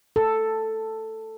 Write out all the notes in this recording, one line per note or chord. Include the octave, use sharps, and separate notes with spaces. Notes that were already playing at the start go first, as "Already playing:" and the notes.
A4